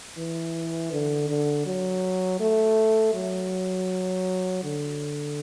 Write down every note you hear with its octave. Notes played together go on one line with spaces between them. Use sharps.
E3
D3
D3
F#3
A3
F#3
D3